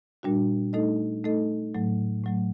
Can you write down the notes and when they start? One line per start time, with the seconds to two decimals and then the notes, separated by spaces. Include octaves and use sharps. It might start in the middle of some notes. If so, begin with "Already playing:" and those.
0.23 A#2 G3 D4 F#4
0.73 A3 D#4 A4 D#5
1.24 A3 D#4 A4 D#5
1.75 A2 F#3 A3
2.24 A2 F#3 A3